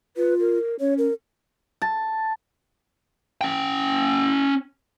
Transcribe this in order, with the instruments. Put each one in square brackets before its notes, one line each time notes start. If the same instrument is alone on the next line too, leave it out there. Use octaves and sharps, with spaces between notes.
[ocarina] F4 [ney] B4
[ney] A#4
[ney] C#4 [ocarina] C#5
[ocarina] A#4
[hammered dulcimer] A5
[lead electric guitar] C#4 G5